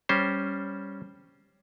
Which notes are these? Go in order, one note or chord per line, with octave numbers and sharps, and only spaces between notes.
G3 C#4 C5